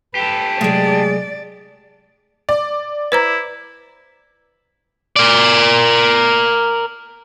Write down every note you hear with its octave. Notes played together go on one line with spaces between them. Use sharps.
G4 A4 B4
C3 F#3 G#3 A3 G#4 D5
D5
E4 B4 C5 A#5
A#4 D5